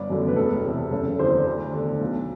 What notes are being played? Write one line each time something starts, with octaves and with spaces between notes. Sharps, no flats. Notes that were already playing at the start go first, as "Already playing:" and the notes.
Already playing: G1 D5
F#2 D3
B4
E1 A4
E2 C3
F#1 A4
E2 D3 C5
D2
D3
B1